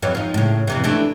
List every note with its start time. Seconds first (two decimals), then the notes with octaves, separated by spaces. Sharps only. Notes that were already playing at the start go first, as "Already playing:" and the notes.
0.02 F2 E3 F#3
0.15 F3 D#4
0.34 A2 C#3
0.67 F2 C3 E3
0.84 E3 A3 D4